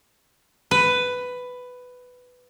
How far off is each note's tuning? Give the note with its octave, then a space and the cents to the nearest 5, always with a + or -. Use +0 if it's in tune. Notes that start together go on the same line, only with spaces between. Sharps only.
B4 +10